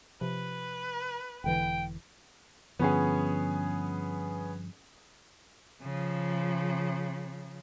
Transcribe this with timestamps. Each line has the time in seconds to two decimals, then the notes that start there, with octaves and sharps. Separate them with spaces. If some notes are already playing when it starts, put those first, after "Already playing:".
0.21 C3 F3 B4
1.44 E1 D3 E3 G5
2.79 G2 D3 F3 B3 C#4 G#4
5.83 C#3 F3